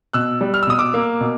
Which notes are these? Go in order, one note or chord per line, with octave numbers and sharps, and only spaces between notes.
B2 E6 F#6
G3
F6
E6
B2 D#6
D6 E6
A#3
B2